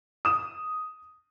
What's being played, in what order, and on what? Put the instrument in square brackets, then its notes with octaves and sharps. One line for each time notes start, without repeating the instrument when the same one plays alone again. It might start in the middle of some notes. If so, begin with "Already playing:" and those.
[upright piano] D#6 E7